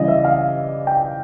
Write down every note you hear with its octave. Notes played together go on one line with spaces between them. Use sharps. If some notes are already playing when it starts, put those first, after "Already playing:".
Already playing: C#3 E3 G3 D5 D#5
E5
F5
G5